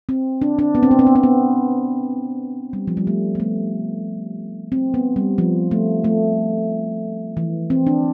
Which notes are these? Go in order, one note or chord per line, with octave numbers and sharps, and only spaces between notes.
C4
D4
D4
B3
C4
B3
C4
B3
C4
B3
G3
F3
G3
A3
B3
A3
C4
B3
G3
F3
A3
A3
E3
C4
D4